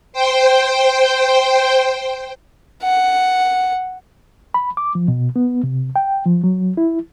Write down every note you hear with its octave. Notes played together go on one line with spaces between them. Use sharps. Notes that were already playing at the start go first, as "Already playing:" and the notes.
C5 G5
F#5
B5
D6
F3
B2
B3
C3
G5
F3
F#3
E4